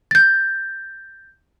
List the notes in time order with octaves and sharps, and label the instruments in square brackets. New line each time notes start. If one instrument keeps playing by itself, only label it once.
[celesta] G6 A6